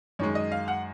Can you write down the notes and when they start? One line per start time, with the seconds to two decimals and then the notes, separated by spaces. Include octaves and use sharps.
0.19 F#2 D#3 G#3 C#5
0.35 D#5
0.52 F5
0.68 F#5